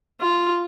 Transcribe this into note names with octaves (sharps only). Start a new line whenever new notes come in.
F4